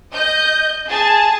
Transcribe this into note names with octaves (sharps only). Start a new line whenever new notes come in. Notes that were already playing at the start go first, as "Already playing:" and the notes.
D#5 G6
G#4 A5